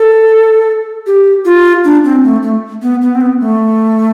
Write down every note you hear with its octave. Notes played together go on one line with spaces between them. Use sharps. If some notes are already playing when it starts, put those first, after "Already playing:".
Already playing: A4
G4
F4
D4
C4
A3
A3
B3
B3
C4
B3
A3